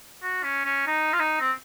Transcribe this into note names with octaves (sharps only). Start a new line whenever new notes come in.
F#4
C#4
C#4
D#4
F4
D#4
C4